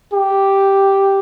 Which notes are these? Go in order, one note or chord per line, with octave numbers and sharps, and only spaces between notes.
G4